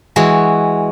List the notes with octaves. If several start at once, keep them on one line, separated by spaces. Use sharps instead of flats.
E3 G#3 F#4